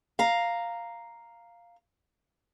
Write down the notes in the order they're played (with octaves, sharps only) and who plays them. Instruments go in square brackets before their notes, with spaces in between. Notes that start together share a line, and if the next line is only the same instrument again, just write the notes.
[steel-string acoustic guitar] F5 A#5